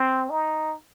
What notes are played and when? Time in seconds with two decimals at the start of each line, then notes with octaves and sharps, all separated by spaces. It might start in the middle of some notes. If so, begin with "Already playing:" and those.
Already playing: C4
0.30 D#4